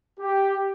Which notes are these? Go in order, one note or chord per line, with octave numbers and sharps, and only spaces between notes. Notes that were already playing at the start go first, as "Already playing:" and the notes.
G4